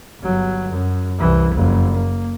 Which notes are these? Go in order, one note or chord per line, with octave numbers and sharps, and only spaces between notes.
G1 F#3
F#2
C2 E3
F#1 F2
A#3